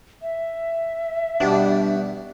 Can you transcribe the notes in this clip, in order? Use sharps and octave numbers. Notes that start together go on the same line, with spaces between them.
E5
B2 G3 D4